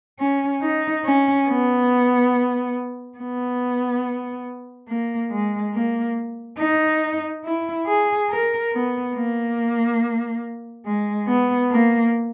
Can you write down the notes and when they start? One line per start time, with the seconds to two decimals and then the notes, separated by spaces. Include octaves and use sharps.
0.19 C#4
0.62 D#4
1.05 C#4
1.48 B3
3.18 B3
4.88 A#3
5.31 G#3
5.73 A#3
6.59 D#4
7.44 E4
7.87 G#4
8.30 A#4
8.72 B3
9.14 A#3
10.85 G#3
11.27 B3
11.71 A#3